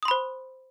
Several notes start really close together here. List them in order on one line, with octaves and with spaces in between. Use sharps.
D#6 C6 B5 C5